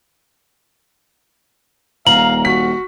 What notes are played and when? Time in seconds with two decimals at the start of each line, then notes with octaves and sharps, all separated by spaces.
2.07 D#1 F5 A#5 F#7
2.45 F#4 B6